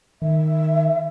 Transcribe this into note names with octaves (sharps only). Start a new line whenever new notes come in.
D#3 E5